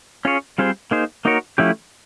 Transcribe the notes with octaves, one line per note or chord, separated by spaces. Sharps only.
C#4 F4 G#4 C#5
G3 C4 F4 G#4 C5
A#3 D#4 G#4 C5
A#3 D#4 F#4 A#4 C#5
F3 A3 C#4 E4 G4